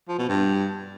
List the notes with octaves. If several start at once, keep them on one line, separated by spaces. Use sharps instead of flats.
F3
B2
G2